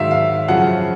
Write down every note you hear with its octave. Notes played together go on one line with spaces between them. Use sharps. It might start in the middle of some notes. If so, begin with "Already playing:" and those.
Already playing: G#2 D#3 F#3 E5 F5
F5
F#2 C#3 F3 F#5